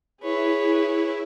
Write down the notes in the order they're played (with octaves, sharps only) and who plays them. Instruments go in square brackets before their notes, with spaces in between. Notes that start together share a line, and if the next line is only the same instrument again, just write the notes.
[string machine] E4 [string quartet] G#4 B4 C#5